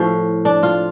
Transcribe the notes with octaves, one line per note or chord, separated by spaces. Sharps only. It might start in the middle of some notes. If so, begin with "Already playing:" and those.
Already playing: A2 F3
D4
F4